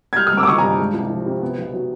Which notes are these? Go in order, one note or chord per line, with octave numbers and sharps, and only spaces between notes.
G#6
G3 F6 G6
D#6 F6
G1 D6 E6
D6
D#3 C#6 D#6
G#5 A#5
G2
G#3
C2
F3
C3
B3
B1
F#3